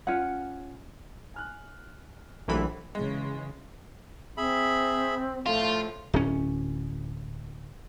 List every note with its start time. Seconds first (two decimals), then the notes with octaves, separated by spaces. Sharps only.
0.07 C#4 F4 F#5
1.34 G#5 F6 F#6
2.48 A#1 E3 F#3 A3 G4 B5
2.95 C#3 E3 G#3
4.37 C4 G#4 E5 B5
5.46 A2 F3 A3 F4
6.14 D1 C#4